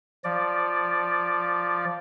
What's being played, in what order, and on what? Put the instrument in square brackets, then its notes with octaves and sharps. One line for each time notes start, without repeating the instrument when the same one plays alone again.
[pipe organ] F3 D5